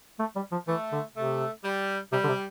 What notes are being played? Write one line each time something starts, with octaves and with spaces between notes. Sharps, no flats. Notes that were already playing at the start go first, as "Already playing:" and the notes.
A3
G3
F3
E3 A3
D3
C3 A3
G3
C3 G3
D3
C3